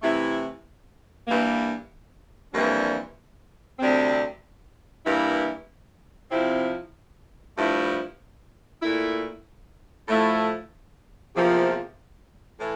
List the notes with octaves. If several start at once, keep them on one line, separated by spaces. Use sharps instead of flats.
C3 E3 A3 E4
G2 E3 A#3
F2 E3 G3 A#3 D4
D2 C3 G3 C4
G2 E3 A#3 E4
C3 F3 C4 E4
G2 F3 A3 E4
A#2 A3 E4
A2 F3 A3 E4
E2 C3 F3 A#3
A2 E3